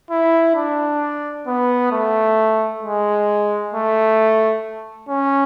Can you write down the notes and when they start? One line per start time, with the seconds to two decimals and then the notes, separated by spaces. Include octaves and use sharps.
0.11 E4
0.55 D4
1.47 B3
1.92 A3
2.83 G#3
3.74 A3
5.09 C#4